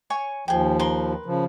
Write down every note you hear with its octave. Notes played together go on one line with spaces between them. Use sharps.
C#5 G#5 C#6
D#2 F3 G#4 G5
A#4 B4 C6
C#3 F3